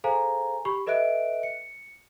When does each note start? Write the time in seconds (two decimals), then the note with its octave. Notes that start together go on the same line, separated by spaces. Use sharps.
0.04 G#4 A4 C5 F5 G#5 A#5
0.65 G4 B5 C#6
0.86 A4 B4 D#5 E5 F#6 D7
1.43 C#7